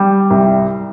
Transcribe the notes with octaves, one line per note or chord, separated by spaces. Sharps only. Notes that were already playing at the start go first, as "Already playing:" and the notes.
Already playing: G3
C2